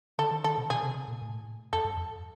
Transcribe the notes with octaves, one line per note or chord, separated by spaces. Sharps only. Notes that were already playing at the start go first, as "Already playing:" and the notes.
D3 A4
D#3
D#3 A4
B2
B2 G#4
C3
C3
A#2
A2
F2 A4
G2
F2